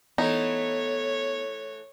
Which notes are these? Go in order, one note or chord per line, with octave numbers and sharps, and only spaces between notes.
E3 A3 B3 D#4 A4 C#5